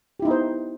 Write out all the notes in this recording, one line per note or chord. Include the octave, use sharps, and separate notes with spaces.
B3 D#4 E4 G4 C5